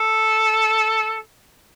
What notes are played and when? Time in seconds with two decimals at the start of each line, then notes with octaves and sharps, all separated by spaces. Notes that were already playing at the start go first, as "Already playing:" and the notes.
Already playing: A4